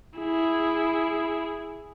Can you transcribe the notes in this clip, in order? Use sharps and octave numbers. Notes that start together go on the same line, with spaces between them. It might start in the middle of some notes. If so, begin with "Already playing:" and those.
E4 G#4